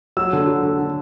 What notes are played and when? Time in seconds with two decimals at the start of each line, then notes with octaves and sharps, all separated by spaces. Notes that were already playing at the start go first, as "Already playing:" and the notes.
0.17 F#3 E6
0.33 D3
0.47 F#3
0.63 D3
0.79 D3